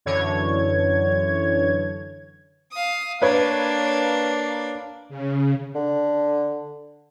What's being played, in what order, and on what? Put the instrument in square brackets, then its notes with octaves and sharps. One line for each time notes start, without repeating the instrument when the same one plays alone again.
[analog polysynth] F#2 D3 E3 C#5 G#6
[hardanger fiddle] F5 D#6
[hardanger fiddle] A#3 D4 [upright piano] B4 C#5 G#6
[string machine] C#3
[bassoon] D3